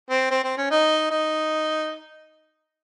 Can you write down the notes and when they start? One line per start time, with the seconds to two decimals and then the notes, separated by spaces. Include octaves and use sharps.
0.10 C4
0.31 C4
0.44 C4
0.58 C#4
0.71 D#4
1.11 D#4